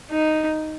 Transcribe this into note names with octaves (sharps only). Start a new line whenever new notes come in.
D#4